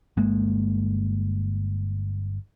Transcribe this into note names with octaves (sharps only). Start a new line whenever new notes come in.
G1 G#3 A#3